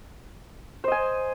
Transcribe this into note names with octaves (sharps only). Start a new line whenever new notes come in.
C5 D#5 G#5